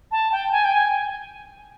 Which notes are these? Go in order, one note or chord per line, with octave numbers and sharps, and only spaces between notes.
A5
G5
G#5
G5
G#5